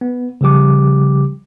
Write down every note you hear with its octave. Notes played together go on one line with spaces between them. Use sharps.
B3
C#3 F3 G3 G4 D6